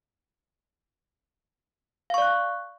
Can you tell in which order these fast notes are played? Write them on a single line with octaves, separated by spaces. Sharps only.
F5 C#6 D5 F#6